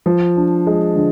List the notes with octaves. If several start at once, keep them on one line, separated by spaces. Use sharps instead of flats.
F3
D4
G#3
D3